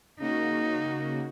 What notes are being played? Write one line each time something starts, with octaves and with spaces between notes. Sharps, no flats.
C#3 A#3 D#4 F#4